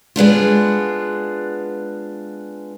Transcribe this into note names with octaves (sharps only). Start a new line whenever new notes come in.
G#3 B3 D4 F4